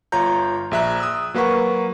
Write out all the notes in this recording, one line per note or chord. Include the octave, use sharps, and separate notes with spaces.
G1 F4 C#5 A#5 G6
A#1 G#4 E5 A#5 F#6
D#6 E6
F#3 A#3 B4 F#5 C#6